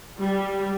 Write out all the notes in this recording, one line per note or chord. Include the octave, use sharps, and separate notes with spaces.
G3